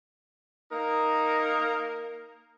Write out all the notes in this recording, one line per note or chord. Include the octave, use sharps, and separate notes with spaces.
A#3 D#4 A#4